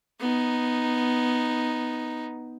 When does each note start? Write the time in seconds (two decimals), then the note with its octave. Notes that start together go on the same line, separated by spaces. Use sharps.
0.20 B3 D#4